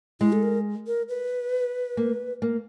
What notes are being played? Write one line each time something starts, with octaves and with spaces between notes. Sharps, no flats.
G#3 E4
A4
A#4
A#4
B4
A#3
A#3